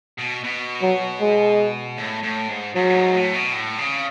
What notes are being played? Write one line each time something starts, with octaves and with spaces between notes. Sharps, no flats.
B2
B2
F#3
G#3
A2
A2
G#2
G#2 F#3
A2
G#2
A2
B2
A2
C#3